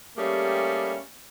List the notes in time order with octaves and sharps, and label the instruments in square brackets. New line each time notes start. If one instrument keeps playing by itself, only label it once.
[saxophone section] G3 A3 A#3 C#4 G4 G#4